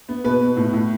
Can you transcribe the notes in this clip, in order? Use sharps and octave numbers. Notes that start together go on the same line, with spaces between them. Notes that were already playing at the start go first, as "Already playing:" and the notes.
B3
B2 B4
B2
A2
A2